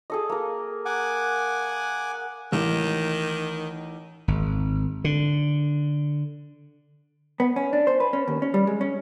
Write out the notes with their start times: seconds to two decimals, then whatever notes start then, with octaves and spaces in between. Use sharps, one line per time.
0.10 G#4 A4 D#5
0.29 A#3 A#4
0.86 F#5 G#5 D6
2.52 A1 D#3
4.28 G#1
5.04 D3
7.40 B3
7.56 C#4
7.73 D4
7.87 C5
8.00 B4
8.13 C#4
8.28 D#2
8.42 C#4
8.54 G3
8.67 G#3
8.81 C#4